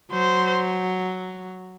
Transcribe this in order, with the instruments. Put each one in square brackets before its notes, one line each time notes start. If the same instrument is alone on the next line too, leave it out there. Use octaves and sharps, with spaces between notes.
[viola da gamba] F#3 [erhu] C5